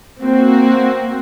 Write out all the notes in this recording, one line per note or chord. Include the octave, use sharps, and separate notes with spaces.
A#3 C4 F#4